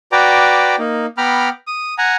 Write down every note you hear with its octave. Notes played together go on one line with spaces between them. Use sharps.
F#4 B4 D5 G5 A#5 D6
A#3 D#4
B3 G5 A#5 B5 D6 F6
D#6
F#5 G#5 A#5